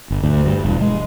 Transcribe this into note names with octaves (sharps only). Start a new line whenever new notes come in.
G1
D2
G2
E1
G#3